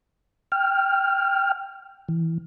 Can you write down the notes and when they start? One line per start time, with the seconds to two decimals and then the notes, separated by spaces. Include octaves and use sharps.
0.52 G5 F6
2.09 E3